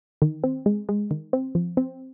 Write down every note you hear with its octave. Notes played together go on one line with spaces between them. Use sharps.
D#3
C4
G#3
G#3
D#3
C4
F3
C4